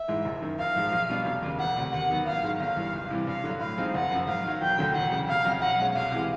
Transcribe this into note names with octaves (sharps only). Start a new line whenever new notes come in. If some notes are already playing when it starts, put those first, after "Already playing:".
Already playing: E5
G#2 E3 G#3
F#1
F#2 D#3
A#1 F5
G#2 F3 G#3
B1
B2 G3 B3 D4
F1
D#2 C#3
E1 F#5
D2 C3
D#2 F#5
D#3 F#3 B3
A1 F5
G#2 D#3 G#3
G1 F5
G2 E3
C#2
C3 E3 G3
G2 F5
D3 F#3
A2 F5
F3 G#3 C4 D#4
F#1 F#5
F#2 C#3 F3
G#2 F5
D#3 F#3
E1 G5
D2 D3 F#3
E1 F#5
E2 C#3
F1 F5
F2 C#3 F#3
B1 F#5
B2 G#3 C#4
C2 F5
C3 E3 G#3